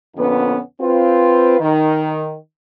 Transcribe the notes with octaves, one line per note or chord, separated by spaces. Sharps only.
F2 A#2 D3 B3 C#4 B4
C4 F4 B4
D#3